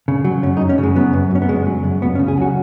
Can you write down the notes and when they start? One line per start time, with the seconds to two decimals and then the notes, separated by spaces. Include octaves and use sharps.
0.08 C#3
0.25 F#3
0.43 F#2 C#4
0.57 D#4
0.61 F#2
0.69 C#4
0.78 C#3
0.83 G#3
0.96 F#3 B3
1.13 F#2
1.31 F#2 C#4
1.42 B3
1.49 C#3 G#3
1.67 F#3
1.84 F#2
2.02 C#2 B3
2.15 C#4
2.19 C#3
2.28 G#4
2.37 F#3 F#4